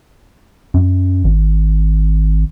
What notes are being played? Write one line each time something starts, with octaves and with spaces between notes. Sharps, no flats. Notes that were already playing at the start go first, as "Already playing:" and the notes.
F#2
G#1